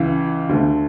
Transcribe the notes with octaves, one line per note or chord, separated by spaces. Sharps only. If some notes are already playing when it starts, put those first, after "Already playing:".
Already playing: C#2 C#3 E3
D2 D3 A3